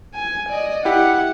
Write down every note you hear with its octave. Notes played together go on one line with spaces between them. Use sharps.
G#5
D5 D#5
E4 G4 F#5